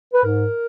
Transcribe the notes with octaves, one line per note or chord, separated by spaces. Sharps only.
B4
G#2 A#4